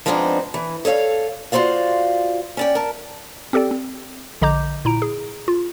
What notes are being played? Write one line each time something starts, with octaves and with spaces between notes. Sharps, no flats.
F3 G#3 B3 C4 D4 D#4
E3
A4 C#5 D#5 F5
F4 F#4 C5 D5 F5
C#4 D5 G5
A#4 A5
C4 G4 A4 D5 G5
C4
A#1 D3 D#5 A#5 D6 G6
A#2 E4 A#5 D7
G#4
F4